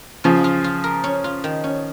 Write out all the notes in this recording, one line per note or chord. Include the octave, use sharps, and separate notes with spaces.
C#3 F3 F4
F4
F4
A#4
C#4
F4
D#3
C#4